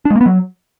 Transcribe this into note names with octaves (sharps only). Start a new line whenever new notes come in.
D4
G#3
A#3
B3
F#3